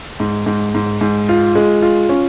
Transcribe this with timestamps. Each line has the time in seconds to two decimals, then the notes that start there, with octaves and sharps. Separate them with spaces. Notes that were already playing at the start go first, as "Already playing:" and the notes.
0.20 G#2
0.46 G#2
0.75 G#2
1.01 G#2
1.29 F4
1.55 G#3
1.82 F4
2.09 C#4